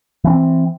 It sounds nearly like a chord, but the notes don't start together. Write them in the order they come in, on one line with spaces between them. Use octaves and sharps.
E3 C#4 C4